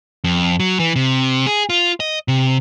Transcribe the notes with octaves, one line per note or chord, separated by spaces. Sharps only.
F2
F#3
E3
C3
G#4
F4
D#5
C3